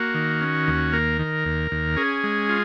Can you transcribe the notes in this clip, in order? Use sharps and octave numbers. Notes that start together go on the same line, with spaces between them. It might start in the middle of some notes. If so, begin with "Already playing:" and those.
Already playing: A#3 F#4
D#3
C#4
D#2
A#3 A#4
D#3
D#2
D#2
C#4 G#4
G#3
F4